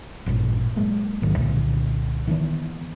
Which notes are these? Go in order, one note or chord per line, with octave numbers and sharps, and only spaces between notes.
A1 G2 A#2
F#3 G#3 A#3
A1 G#2 D#3 F#3
C2 A#2 D3
D#3 E3 B3